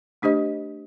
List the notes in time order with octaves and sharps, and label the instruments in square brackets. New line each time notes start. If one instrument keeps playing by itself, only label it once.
[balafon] A3 D4 G4 C5 D#5